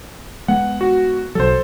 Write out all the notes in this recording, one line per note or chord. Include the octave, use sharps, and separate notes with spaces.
G#3 B3 F#5
F#4
B1 F#3 A4 C5